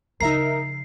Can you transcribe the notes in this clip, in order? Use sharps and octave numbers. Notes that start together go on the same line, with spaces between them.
C#3 F3 D#4 A#4 E5 A#5 C7